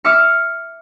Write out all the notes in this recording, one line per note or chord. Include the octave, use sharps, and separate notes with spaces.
E5 D6 F6 C#7